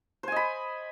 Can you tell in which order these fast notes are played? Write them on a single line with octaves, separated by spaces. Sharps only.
C5 G#5 D#5 B5